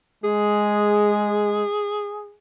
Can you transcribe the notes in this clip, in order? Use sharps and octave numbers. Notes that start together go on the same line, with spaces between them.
G#3 G#4